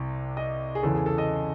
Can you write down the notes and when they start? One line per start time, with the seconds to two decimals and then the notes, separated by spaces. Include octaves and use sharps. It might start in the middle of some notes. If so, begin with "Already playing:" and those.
Already playing: C2 C3
0.37 D#5
0.75 G#4
0.83 E2 C#3 E3 A4
0.94 G#4
1.06 A4
1.18 D#5